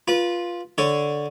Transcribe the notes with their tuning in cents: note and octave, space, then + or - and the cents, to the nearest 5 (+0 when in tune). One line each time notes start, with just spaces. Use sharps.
F4 +0 B4 -25
D3 +0 C#5 +0